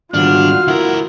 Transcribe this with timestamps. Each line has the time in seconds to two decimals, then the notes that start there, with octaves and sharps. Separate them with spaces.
0.14 G#2 D#3 G3 D4 F4 F#4 F6
0.68 D2 E4 A#4